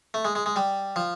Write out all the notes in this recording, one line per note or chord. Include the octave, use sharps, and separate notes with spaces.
A3
G#3
G#3
G#3
G3
F3